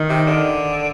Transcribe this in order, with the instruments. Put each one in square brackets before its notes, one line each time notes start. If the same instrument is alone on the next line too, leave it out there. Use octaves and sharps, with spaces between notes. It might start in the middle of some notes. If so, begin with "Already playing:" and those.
Already playing: [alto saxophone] D#3
[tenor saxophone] C3
D3